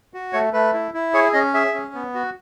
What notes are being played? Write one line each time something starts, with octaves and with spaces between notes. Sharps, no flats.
F#4
A3 C#5
A3 B4
E4
E4
G#4 C#5
C#4 D#5
G#4 E5
C#4
B3
F#4